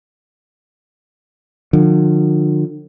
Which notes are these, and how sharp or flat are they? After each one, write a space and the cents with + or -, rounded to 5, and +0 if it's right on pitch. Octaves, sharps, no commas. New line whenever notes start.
D3 +45 F3 +35